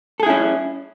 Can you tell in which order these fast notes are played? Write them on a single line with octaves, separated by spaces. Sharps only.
A4 G#4 E4 C#4